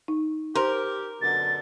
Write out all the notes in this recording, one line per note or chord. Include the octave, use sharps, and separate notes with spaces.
D#4
G4 A#4 C5 C6
F#2 B2 D3 A6